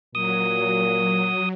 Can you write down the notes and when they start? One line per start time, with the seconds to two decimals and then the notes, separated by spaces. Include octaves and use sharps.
0.15 A#2 F#3 D#6